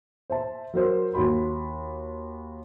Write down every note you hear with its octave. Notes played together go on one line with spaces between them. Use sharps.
C5 E5 A5
F#3 A#4 C5
D#2 F#4 B5 C6